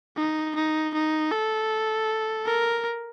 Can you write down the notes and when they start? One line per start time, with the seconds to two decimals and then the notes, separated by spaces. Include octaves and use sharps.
0.17 D#4
0.55 D#4
0.94 D#4
1.31 A4
2.46 A#4